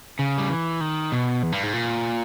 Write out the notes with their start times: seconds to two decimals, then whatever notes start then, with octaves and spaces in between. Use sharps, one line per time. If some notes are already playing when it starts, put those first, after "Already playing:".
0.19 C#3
0.38 G3
0.50 E3
0.81 D#3
1.12 B2
1.43 E2
1.52 G2
1.63 G#2
1.74 A#2